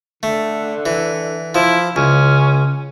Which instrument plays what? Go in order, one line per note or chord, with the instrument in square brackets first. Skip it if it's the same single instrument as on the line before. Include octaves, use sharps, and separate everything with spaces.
[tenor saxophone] D3 [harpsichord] A3
[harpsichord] E3
[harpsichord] F3 [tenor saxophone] E4
[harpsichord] C#2 [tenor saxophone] C#4